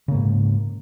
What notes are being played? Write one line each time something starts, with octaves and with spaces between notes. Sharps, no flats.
G#2 C#3 A#3